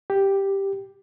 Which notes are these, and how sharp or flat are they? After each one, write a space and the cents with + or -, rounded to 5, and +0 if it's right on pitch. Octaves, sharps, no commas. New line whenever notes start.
G4 +0